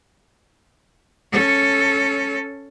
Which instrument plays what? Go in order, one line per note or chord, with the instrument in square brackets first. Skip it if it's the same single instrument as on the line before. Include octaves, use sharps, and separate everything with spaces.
[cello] C#4 A4